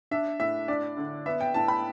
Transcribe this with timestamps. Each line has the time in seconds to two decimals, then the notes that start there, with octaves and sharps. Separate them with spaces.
0.11 D4 E5
0.40 A2 E5
0.68 D4 D5
0.97 D3
1.26 B3 E5
1.40 G5
1.54 A2 A5
1.68 B5